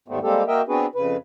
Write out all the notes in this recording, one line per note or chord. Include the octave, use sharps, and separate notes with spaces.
D#2 G#2 G3 A3 B3 C4
G3 G#3 A#3 C4 G4 A4
A#3 F#4 A#4 D#5 E5 G5
B3 C4 D4 F#4 G#4 B4
F2 C#3 B4